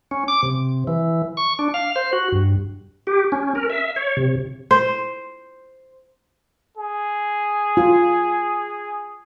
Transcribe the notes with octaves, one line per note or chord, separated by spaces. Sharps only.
C#4
D6
C3
E3
C#6
D4
F5
C5
F#4
G2
G4
C#4
A#4
E5
C#5
C3
C5
G#4
F4